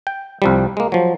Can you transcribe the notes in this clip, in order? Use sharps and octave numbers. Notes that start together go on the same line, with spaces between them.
G5
C2 F3 G3
G#3 A#3
F3 F#3